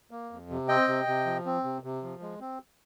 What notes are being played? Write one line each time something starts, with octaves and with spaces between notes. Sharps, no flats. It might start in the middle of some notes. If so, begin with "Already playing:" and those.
A#3
F2
C3
C4 D#5 G5
C3
C3
F3
C4
C3
C3
F3
G#3
C4